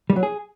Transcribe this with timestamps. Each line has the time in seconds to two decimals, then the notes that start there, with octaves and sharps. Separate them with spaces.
0.10 G3
0.16 F#3
0.23 G#4